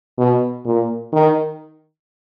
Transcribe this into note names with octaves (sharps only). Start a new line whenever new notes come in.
B2
A#2
D#3